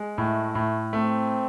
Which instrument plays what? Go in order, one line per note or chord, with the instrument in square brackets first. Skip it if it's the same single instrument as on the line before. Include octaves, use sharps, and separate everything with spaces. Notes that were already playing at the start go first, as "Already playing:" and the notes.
Already playing: [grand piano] G#3
[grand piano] A2 [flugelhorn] A3
[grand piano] A2
[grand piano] A3 [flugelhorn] C4